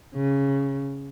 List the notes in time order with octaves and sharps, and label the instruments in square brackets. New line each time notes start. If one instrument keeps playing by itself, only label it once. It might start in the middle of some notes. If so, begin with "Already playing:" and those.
[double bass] C#3